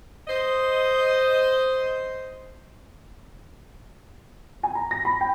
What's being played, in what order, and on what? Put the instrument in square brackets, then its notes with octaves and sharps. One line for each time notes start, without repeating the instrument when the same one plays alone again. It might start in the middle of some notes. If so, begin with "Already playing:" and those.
[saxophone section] C5 D#5
[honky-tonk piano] G#5
A#5
A#6
B5
G5